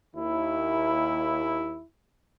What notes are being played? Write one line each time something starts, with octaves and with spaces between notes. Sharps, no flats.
D#2 E4